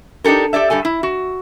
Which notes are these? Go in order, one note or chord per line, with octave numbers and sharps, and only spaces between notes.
D4 D#4 G4 A4 A#4
G4 A4 D5 E5
G2 G4 A4 G#5
E4
F#4